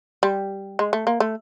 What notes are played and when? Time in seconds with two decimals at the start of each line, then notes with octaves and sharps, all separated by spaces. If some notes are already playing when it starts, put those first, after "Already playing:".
0.23 G3
0.79 G#3
0.93 A3
1.07 A#3
1.20 A3